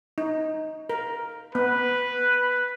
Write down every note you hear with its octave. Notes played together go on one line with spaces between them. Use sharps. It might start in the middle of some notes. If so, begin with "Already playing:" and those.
D#4
A#4
B3 B4